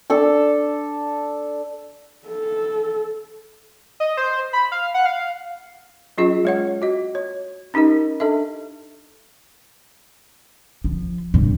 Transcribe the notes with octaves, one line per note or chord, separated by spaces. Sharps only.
D4 A4 A5
A4
D#5
C5
B5
F5
F#5
F5
F#3 C#4 F4 G#4 D#5
G#3 C#5 F#5
F#4 D#5
C#5
C#4 D#4 G4 A#4 D#5
D4 A4 D#5 E5
F3
G2 C3